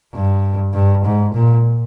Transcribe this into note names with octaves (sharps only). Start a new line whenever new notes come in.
G2
G2
G#2
A#2